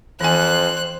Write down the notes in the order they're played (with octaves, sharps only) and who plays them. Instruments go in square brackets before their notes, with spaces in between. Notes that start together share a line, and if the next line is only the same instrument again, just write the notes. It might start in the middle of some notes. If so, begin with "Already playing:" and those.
[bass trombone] F2 [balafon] E3 G#5 [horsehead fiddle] C5 [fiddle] F#6